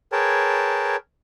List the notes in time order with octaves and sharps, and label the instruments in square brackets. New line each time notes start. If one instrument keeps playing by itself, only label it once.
[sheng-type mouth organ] G#4 A#4 B4 C#5 G5 A5